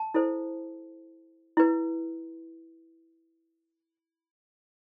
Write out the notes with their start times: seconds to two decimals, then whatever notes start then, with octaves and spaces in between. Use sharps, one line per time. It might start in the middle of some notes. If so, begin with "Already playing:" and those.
Already playing: A5
0.14 E4 A4 C5
1.57 E4 B4